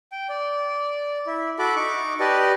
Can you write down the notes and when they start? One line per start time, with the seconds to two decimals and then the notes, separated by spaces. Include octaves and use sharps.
0.12 G5
0.29 D5
1.27 E4
1.59 F#4 A4 B5 D6
1.76 D#4 C#6 D6
2.20 G4 B4 D5 D#5 A5